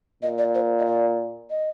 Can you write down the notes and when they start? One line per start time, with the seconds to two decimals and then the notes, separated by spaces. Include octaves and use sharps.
0.22 A#2 D#5
0.38 D5
0.55 C5
0.79 D#5
0.86 D5
1.50 D#5